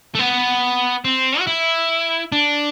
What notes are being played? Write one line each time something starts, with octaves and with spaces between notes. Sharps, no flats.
A3
B3
C4
F#4
E4
D4